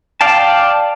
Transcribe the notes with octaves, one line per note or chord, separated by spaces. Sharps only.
D5 F5 G5 A5